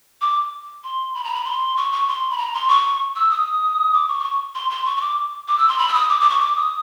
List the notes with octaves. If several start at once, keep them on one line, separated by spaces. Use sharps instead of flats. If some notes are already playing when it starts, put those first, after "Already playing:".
D6
C6
B5
A#5
B5
C6
C#6
C#6
C6
B5
A#5
C6
C#6
E6
D#6
D6
C#6
D6
C#6
C6
C6
C#6
C#6
D6
D6
E6
C6
B5
E6
D#6
D6
D6
C#6
D6
D#6